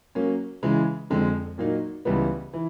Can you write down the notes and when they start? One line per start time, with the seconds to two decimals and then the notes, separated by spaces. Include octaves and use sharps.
0.15 F#3 A#3 C#4
0.63 C#3 E3 G#3
1.10 F2 D3 F3 G#3
1.58 A#2 F#3 A#3 D#4
2.05 C#2 C#3 E3 G3 B3
2.53 E3